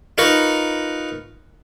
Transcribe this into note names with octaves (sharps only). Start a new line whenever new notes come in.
D#4 F4 A#4 B4 C#6